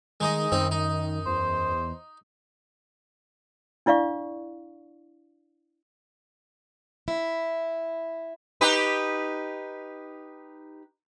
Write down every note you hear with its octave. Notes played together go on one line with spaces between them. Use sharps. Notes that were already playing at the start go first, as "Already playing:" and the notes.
D#3 G#3 D#4 D#5
F#2 D#3 C4 D#4
D#4
E2 C5
D4 E4 D5 F5 C#6
E4
D#4 G4 B4